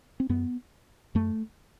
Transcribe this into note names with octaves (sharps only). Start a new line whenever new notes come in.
C4
F#2 B3
F#2 A3